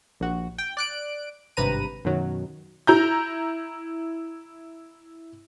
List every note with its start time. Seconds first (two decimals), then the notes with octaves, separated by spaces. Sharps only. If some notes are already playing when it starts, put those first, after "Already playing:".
0.20 A#1 F#4
0.58 G5
0.77 D5 F#6 D7
1.57 G#1 G2 C3 B4 A#5 D#7
2.05 F#2 B2 D#3 F#3
2.87 E4 A#5 G6